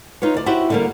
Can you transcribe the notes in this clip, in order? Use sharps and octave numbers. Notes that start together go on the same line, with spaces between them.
D#4 F4 B4 C#5
D2 D5
E4 F#4 G4 C5 E5 F#5
D3 G3 A#3